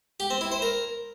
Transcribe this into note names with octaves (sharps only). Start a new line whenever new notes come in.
G4
C4
E4
C5
A#4